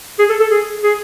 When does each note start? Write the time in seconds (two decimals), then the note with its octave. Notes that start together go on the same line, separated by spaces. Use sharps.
0.19 G#4
0.29 A4
0.40 A4
0.51 G#4
0.83 G#4